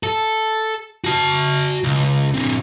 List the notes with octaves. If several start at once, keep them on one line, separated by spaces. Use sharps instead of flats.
A4
F#4 A5
C#2
D3 C4